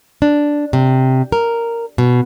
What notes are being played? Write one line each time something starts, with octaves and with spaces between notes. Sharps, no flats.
D4
C3
A#4
B2